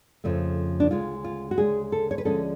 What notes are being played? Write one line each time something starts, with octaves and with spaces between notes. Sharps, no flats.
F2 C#3 F3 A3
D4
D2 C#3 G#3 F4
F4
F#4
D2 C#3 G#3 G#4
A4
C#5
B4
D2 D3 F3 G#3 C#4 A4